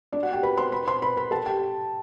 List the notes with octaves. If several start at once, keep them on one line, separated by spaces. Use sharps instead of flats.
D4 D5
F#4 F#5
G4 G5
B4 B5
C5 C6
B4 B5
C5 C6
B4 B5
B4 B5
A4 A5
G4 G5